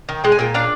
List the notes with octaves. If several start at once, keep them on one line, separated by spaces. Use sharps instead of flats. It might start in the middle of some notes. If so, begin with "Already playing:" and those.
D#3
G#3 G5
G#5
A#2 G5
D4 F5